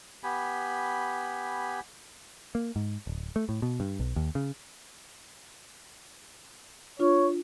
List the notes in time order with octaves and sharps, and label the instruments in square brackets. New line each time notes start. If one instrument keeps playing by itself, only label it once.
[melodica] B3 G4 G#5 B5
[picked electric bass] A#3
G#2
D1
A3
A2
B2
G2
B1
D#2
C#3
[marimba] D4 F4 [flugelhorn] C#5